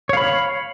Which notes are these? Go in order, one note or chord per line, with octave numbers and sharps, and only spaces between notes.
C#5 F5 B5